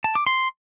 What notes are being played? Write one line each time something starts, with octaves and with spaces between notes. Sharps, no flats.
A5
D6
C6